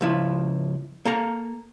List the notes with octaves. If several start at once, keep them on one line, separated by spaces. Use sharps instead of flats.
C#2 F3 E4
A#3 A4 A#5